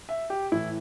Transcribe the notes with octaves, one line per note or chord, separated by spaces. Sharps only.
E5
G4
A2 E3 E4